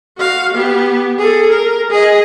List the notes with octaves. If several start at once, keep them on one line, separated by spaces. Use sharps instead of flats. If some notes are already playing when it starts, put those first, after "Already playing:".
F#4 F5
B3 G4
G#4 A4
A#4
G#4 D#5